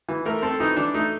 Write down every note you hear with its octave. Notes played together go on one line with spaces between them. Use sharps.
E3
A3 A#4
C4 A4
E3 D#4
E3 D4
A3 D#4